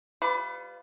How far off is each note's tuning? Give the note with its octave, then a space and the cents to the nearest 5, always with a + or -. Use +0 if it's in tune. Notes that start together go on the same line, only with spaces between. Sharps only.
G3 +0 F4 +0 B4 +35